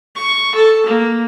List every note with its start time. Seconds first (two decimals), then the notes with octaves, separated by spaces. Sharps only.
0.16 C#6
0.55 A4
0.86 A#3